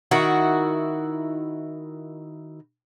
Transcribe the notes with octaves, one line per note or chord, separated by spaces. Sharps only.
D#3 E4 F#4